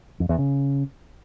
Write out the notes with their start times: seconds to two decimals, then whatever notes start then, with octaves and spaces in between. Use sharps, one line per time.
0.20 F2
0.29 E2
0.38 C#3